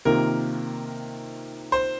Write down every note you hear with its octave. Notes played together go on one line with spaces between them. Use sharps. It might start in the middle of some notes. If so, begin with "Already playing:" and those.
C3 D#3 A#3 F4 A#4
C5